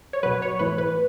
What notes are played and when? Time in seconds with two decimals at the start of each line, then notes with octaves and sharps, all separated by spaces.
0.13 C#5
0.23 F#3 B4
0.26 B2
0.42 C#5
0.59 A2 E3 B4
0.78 B4